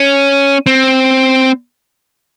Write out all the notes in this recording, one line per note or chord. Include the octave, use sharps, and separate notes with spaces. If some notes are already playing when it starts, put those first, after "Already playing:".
Already playing: C#4
C4